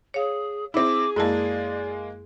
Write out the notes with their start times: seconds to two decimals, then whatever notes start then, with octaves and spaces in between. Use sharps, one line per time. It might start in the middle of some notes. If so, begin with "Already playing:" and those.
0.14 G#4 C#5 F5
0.74 C4 E4 G#4 D6
1.16 F#2 G#3 A#3 E4 D5 A5